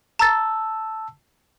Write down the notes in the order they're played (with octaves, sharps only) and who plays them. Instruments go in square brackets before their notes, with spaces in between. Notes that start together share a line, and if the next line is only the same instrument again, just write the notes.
[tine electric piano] A5 E6 [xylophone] A#5 A6